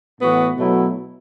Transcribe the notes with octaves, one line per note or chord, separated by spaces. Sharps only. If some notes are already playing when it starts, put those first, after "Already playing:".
A2 E3 B3 F#4
B2 F#3 A3 E4